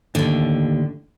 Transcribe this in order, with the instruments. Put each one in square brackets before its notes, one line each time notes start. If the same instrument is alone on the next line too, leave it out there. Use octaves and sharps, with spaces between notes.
[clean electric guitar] D#2 [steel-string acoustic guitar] A2 D3